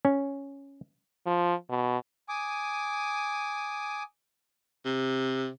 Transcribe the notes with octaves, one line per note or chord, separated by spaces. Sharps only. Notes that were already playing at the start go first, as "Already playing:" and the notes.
C#4
F3
B2
G#5 D6 D#6
C3